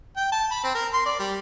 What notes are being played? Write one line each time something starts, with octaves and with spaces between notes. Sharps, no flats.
G5
A5
B5
C4
A#4
C6
D5
G3